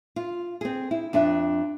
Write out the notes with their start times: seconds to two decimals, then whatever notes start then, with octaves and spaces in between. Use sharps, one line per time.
0.16 F4
0.61 C4 G#4
0.91 E4
1.13 F2 D4 E5